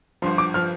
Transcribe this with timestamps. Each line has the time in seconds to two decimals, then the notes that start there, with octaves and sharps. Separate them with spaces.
0.22 G1 G2 F3 C6
0.38 D6
0.54 F3 F6